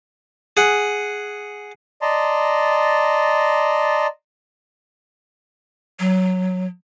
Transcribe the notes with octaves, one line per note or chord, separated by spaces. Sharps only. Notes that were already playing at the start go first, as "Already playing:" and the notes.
G#4 F#5
D5 D#5 A5 A#5 C6
F#3